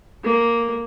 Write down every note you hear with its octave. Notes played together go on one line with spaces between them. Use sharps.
A#3